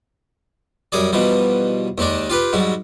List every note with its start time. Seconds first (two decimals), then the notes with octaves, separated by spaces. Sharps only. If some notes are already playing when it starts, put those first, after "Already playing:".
0.92 F#2 G3 G#4 D5
1.13 B2 E3 F3 G3
1.98 D#2 D#3 G#3 D4
2.30 F4 G4 B4
2.53 G#2 F#3 G3